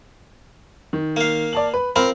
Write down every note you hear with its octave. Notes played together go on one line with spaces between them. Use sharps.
D#3
A#3 F5
D5 A5 F#7
B4
C4 F4 A#4 B5